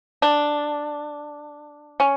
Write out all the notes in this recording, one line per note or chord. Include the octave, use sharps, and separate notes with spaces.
D4
C#4